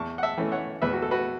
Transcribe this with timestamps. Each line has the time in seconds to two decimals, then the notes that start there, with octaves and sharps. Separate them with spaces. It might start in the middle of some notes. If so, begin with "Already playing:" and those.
Already playing: E2 A5 C#6
0.18 F#5
0.23 E5 A5
0.37 E3 A3 C#4
0.52 C#5 F#5
0.82 E2 B4 E5
0.93 F#4
1.02 A4
1.11 F#4 B4